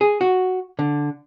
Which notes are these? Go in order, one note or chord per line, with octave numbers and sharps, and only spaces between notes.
G#4
F#4
D3